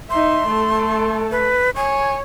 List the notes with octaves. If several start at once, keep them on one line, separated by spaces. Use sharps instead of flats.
D#4 E5 C6
A3 A4
B4
C#5 G#5